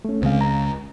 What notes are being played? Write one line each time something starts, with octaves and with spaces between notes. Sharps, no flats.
A3 C#4
C#2 C#3 G#3 C4 F5
A#5